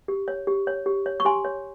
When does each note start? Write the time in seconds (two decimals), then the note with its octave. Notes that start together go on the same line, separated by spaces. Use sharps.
0.08 G4
0.28 C#5
0.47 G4
0.67 C#5
0.86 G4
1.06 C#5
1.20 C#6
1.25 G4 G#5 C6
1.45 C#5